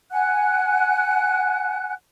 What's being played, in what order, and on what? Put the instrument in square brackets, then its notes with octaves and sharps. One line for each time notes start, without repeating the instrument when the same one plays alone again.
[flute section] F#5 G#5 F#6